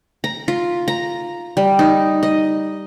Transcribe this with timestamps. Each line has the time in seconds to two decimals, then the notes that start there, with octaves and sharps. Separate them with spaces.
0.24 A#5
0.48 F4
0.88 A#5
1.57 G3
1.79 D#4
2.23 D#5